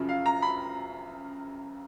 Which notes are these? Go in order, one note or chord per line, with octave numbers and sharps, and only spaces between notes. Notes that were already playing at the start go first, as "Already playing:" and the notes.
Already playing: F#2 C#3 F3
F5
A#5
B5